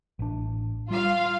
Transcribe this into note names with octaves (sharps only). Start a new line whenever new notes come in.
A1 D4
G3 F4 F5